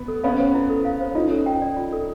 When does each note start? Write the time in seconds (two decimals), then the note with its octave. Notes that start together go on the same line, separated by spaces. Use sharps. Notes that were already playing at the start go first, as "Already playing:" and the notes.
Already playing: B3
0.08 A4
0.24 B3 C#4 F5
0.38 C5
0.54 E4
0.69 A4
0.85 F5
1.01 C5
1.15 C#4 D#4 F4
1.31 A4
1.46 G5
1.62 D5
1.77 F4
1.93 A4